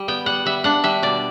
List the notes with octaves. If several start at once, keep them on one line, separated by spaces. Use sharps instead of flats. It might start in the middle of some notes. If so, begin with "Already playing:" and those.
Already playing: G3
B3 G5
G3 F#5
G3 E5
D4 F#5
G3 E5
B2 D5